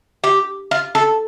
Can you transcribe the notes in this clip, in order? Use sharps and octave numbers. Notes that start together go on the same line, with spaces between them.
G4
F4
A4